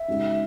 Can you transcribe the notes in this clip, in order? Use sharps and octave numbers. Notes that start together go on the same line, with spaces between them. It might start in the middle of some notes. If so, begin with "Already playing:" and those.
Already playing: E5
C#3 G#3 D#4 F#4